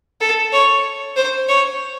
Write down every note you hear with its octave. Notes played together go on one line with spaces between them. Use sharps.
A4
C#5
C5
C#5